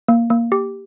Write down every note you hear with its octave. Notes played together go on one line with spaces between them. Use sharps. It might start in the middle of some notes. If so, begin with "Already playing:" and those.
A#3
A#3
G4